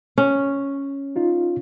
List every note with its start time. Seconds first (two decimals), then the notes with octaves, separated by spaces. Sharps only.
0.18 C#4
1.16 D#4 F4